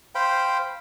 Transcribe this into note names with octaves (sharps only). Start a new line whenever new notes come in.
C5 F5 G5 B5